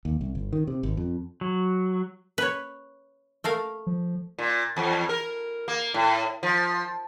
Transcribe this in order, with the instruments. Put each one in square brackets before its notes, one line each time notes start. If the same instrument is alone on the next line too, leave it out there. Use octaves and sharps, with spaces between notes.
[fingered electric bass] D#2
C2
G1
D#3
C3
G#1
F2
[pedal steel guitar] F#3
[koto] B4 C#5
A3 A#4 F5
[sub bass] F3
[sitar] A#2
E2
A#4
A#3
A2
F3